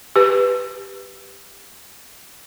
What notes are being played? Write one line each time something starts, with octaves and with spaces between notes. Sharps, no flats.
G4 B4